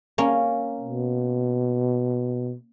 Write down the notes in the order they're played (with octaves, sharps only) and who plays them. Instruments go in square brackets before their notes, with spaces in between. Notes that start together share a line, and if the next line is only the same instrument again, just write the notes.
[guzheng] A#3 C#4
[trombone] B2